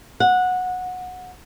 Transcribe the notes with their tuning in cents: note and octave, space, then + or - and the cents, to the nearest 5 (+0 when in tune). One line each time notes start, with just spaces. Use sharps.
F#5 -15